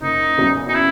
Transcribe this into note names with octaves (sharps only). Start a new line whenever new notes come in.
F#1 D#4
E2 C#3 F#3
D#4
E4